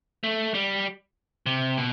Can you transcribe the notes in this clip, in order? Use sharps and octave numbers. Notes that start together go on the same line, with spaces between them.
A3
G3
C3
B2